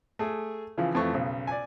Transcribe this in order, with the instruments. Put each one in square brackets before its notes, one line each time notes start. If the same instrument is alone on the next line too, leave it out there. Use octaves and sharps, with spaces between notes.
[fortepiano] A3 G#4
C#3 E3 F3
F2 E3 A3 C#6
B1 C#3
D5 G#5